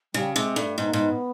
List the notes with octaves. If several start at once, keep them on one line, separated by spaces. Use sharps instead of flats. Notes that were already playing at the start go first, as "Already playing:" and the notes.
C#3 G3
C3 G#3
G2 A3
G#2 B3
A#3
G#2 B3